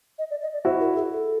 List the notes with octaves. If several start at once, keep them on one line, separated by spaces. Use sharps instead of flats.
D#5
D5
D#5
D5
E4 F#4 C5
A#4
G#4
A4